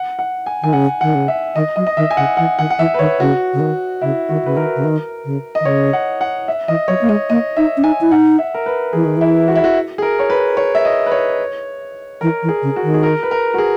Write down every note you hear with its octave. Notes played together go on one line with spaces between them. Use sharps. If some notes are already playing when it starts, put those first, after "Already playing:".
Already playing: F#5
F#5
G#5
D#3 G#5
C#3 F#5
D#3 F#5
C#3
E5
D#3 D#5
F#3 D#5
D#5
D#3 E5
G#5
C#3 F#5
E3 F#5
D#3 F#5
F#5
E3 E5
B4
D#3 C#5
C#3 F#4
C#3
D#3
C#3 E4
D#3 F#4
C#3 B4
D#3 A#4
C#3
D#3
C#3
D#5
D#3
C#3 C#5
F#5
F#5
E5
E3 D#5
F#3 C#5
A#3
G#3 D#5
A#3 D#5
D#4 E5
C#4
D#4 G#5
E4
D#4 F#5
E5
A#4
B4
E3 G#4
D#3
E3 E4
F#4
E4
F#4
G#4
A#4
C#5
B4
C#5
E5
D#5
B4
C#5
E3 A#4
E3
G#4
C#3
F#4
D#3
G#4
A#4
B4
A#4
F#4
G#4